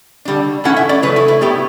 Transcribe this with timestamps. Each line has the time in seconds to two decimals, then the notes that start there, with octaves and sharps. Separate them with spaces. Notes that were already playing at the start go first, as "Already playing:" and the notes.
0.25 D3 G3 D4
0.64 G2 E3 A3 C#4 E4 F#5
0.76 E5
0.89 D5
1.02 E2 C#3 F#3 A3 B4
1.16 E4
1.28 E4
1.41 A2 G3 B3 E4 G4